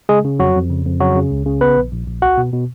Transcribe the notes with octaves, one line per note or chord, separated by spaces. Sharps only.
C#3 G#3 G#4
C#3
F2 F#3 F#4
F2
C#3
F2
C#3 F#3 F#4
C#3
C#2
C#3
A#1 B3 B4
A#1
A#1
A#1
C#2 F#4 F#5
B2
B2